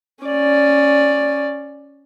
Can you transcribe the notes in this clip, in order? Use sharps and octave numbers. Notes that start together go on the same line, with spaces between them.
C#4 D5